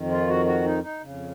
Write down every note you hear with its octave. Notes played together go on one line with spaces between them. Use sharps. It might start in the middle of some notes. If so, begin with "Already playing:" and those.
Already playing: F2 D#3
F4
F#4
F#4
D#4
D#4
F2 C#3